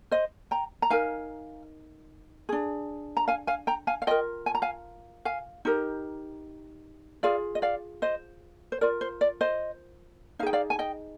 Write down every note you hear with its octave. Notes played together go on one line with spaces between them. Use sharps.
C5 D#5
G5 A#5
A#5
D#4 A#4 F5 G#5
D4 G#4
A#5
F5 G#5
F5 G#5
G5 A#5
F5 G#5
F5
F4 A#4 D#5 G5
G#5
A#5
F5 G#5
F5 G#5
D#4 G4 A#4
F4 G#4 D5 F5
D#5
D5 F5
C5 D#5
C5
F4 A#4 D5
C5
D5
C5 D#5
D#4 G#4 F5 G5
D5 F5
G#5
D#5 G5